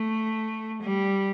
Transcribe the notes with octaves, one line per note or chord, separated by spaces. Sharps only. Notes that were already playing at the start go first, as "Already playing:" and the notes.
Already playing: A3
G3